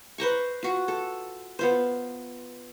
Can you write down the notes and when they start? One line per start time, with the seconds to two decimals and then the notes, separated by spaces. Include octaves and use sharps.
0.18 B4 C5 A#5 C#6
0.63 F4 F#4
0.88 A4
1.59 B3 F4 C5